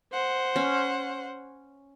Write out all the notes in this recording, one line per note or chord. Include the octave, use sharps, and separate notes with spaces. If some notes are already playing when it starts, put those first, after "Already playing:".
C5 F#5
C#4